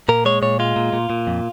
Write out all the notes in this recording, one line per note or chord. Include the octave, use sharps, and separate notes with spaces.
A#2 A#4
G#3 C#5
A#2 C#5
G#3 F4
A#2
A#2
A#2
F2